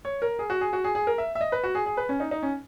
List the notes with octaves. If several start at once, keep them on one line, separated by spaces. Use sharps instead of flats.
C#5
A#4
G#4
F#4
G#4
F#4
G#4
G#4
A#4
E5
E5
D#5
B4
F#4
G#4
G#4
B4
C#4
D#4
D#4
C#4